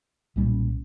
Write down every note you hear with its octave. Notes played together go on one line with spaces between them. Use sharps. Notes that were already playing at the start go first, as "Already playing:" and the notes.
B1 A#2 G3 C#4